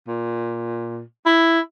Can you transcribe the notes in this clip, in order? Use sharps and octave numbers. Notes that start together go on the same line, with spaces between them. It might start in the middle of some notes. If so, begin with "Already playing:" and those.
A#2
E4